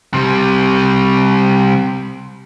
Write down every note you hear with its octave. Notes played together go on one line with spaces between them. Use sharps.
C3 G3